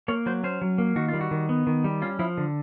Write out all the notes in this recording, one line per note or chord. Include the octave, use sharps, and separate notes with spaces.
A#3 C#5
F#3 C5
C#4 C5
F#3
A#3
D#3 F#4
G3 F4
F#4
D#3
B3
D#3
G3
C#4 F4
F3 E4
D3